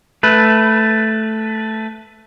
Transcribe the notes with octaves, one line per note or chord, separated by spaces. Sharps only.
A3 B4